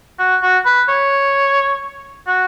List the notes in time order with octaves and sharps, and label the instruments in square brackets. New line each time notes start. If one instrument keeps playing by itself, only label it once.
[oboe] F#4
F#4
B4
C#5
F#4